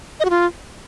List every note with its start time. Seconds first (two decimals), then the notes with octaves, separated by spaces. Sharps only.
0.20 D#5
0.25 F#4
0.30 F4